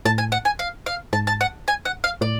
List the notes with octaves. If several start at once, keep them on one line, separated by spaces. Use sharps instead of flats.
A2 A5
G#5
F#5
G#5
F5
F5
G#2 A5
A5
F#5
G#5
F#5
F5
A2 D5